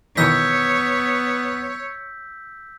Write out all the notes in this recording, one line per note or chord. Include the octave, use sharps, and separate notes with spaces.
B2 D#3 E3 B3 C#5 E6 G6 B6